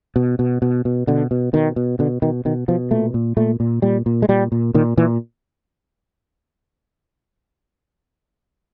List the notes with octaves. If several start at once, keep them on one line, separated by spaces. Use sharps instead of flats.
B2
B2
B2
B2
B2 D3
B2
B2 D#3
B2
B2 D3
B2 D#3
B2 D#3
B2 F3
A#2 A3
A#2
A#2 A3
A#2
A#2 G3
A#2
G#3
A#2 G3
A#2
A#2 D#3
A#2 E3